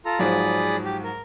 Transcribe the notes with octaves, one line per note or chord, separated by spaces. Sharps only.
F4 A4 A#5
G#2 F3 F#3 G#4 D5 B5
G4
A#4